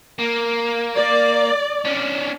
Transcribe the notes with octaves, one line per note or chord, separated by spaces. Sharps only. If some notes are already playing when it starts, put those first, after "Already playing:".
A#3
D5
C#4 D4